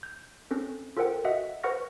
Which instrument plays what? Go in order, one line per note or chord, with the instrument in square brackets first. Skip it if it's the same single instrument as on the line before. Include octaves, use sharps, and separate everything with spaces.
[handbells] G6
C4 C#4 A4
F4 A4 A#4 C5 F#5 G5
F#4 D#5 E5 F#5
B4 C5 F#5 C#6 F6 A#6